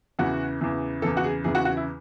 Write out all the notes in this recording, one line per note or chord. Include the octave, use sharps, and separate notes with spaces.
E2 C#3 E3 F#4
E2 C#3 E3
E2 C#3 E3 A4
F#4
G#4
E2 C#3 E3 G#4
F#4
F#4
E4